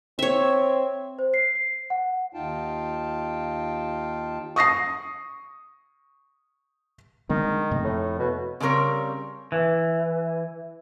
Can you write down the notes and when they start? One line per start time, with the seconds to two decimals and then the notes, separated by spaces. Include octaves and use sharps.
0.19 C4 C#5 E5
1.19 C5
1.34 C7
1.55 C7
1.90 F#5
2.34 D#2 D#4 F4 F5 G5 A5
4.56 C#6 D#6 A#6 C7
7.29 D3 D#3 G#3 C4
7.71 F2 C3 A3
7.84 A2
8.19 B2
8.60 C#3 G3 C4 A#4 C#5
9.52 E3